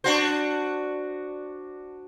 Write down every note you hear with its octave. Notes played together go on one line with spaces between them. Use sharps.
D4 F#4 C5